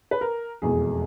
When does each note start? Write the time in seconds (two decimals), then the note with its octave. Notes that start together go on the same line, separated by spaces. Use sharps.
0.11 B4
0.21 A#4
0.62 F1 E2 B2 G#3 G#4